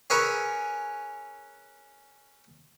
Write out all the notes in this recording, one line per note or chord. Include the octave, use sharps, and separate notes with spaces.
C#4 G#4 A#4 B4 C#5 E5